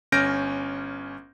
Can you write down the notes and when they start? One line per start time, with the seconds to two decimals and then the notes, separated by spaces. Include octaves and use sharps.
0.12 G1 C#4 F6 G6 A#6 D7